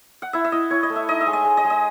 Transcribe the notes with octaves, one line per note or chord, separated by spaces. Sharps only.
F#5
E4 E5
E5
E4 D#5
E4 C#5
D#5
A3
E5
D#4 D#5
E5
G#3
D#5
G#3
D#5
G#3
D#5